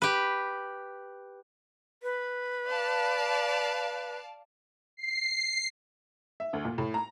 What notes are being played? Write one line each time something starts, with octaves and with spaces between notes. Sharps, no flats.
G4 B4
B4
D5 F5 A5
C7
E5
D2
A#2
A2
A#5